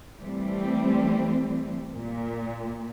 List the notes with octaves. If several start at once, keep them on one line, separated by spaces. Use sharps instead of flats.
E3 G3 A3 C4
A#2